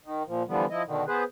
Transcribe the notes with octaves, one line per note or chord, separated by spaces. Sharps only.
D#3
A#2 F3
D3 E3 F3 G3 B3
F3 E4 D#5
B2 D3 D#3
B3 G#4 B4 C5